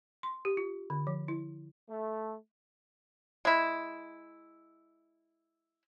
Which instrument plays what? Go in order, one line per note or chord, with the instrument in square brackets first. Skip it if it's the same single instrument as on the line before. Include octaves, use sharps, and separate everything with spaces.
[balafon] C6
G4
F4
D3
F3
E4
[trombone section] A3
[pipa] G#3 E4